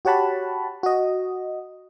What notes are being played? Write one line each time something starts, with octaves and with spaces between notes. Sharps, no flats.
F#4 G4 C#5 F#5 A5 B5
F#4 D#5